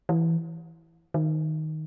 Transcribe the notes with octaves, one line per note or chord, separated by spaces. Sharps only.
E3
D#3